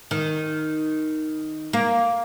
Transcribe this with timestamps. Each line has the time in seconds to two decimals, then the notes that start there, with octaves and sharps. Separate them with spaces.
0.11 D#3
1.73 A#3